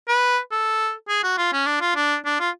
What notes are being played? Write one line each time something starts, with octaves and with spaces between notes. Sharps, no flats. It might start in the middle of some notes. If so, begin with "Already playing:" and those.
B4
A4
G#4
F#4
F4
C#4
D4
F4
D4
D4
F4